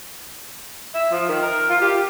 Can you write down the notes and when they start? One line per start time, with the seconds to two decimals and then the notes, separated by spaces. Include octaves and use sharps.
0.94 E5
1.11 F3
1.29 D#3
1.42 A#4
1.69 F4
1.82 G4